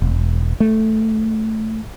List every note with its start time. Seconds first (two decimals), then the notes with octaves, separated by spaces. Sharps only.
0.02 E1
0.60 A3